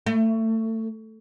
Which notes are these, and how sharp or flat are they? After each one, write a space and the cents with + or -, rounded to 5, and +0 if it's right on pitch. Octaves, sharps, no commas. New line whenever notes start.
A3 +25